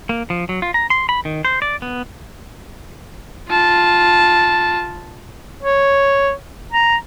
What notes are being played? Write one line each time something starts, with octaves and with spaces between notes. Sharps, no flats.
A#3
F3
F#3
F4
A#5
C6
B5
D#3
C5
D5
B3
F4 A5
C#5
A#5